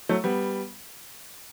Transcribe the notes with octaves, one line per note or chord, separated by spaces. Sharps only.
F#3 A3
G3 B3